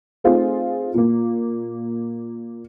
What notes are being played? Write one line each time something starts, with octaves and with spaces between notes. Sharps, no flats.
A3 C4 D#4 F4 G#4
A#2 A#3